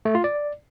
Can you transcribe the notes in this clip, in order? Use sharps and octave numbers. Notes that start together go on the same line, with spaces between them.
A3
F4
D5